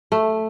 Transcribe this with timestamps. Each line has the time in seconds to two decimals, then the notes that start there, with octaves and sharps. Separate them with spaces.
0.12 A3